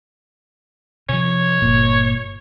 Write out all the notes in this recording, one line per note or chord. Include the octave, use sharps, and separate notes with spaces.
C3 F3 C#5
G1 A#2